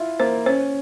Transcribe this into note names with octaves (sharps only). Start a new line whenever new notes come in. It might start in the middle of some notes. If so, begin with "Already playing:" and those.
Already playing: E4 F4
A#3 C5
C#4 C5